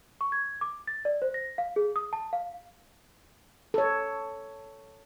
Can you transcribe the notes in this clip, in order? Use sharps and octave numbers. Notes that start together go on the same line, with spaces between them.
C#6
G#6
D6
A6
D5
C5
A#6
F5
G#4
D#6
A5
F5
A4 C#5